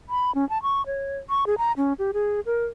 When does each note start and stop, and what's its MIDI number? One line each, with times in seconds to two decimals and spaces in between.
0.09 0.34 83
0.35 0.48 61
0.50 0.61 81
0.63 0.85 85
0.86 1.18 73
1.29 1.44 85
1.47 1.55 68
1.58 1.72 82
1.77 1.93 61
1.99 2.11 67
2.14 2.40 68
2.46 2.65 70